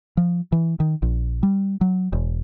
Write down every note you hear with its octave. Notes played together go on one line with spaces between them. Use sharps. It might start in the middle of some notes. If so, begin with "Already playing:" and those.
F3
E3
D#3
A#1
G3
F#3
E1